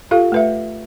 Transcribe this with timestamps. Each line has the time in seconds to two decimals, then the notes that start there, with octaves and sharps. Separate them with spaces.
0.11 F4 G4 A4 F5
0.32 A3 B4 E5